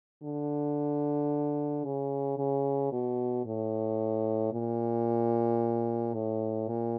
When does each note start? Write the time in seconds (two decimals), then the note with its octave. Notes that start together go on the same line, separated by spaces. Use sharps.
0.23 D3
1.84 C#3
2.38 C#3
2.92 B2
3.45 A2
4.53 A#2
6.13 A2
6.68 A#2